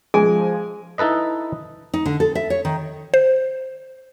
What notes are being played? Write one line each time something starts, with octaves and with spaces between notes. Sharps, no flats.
F3 G#3 G#4 G#5
D#4 E4 A4 B4 D#5
D#4
D3
A4
E5
C#5
D#3
C5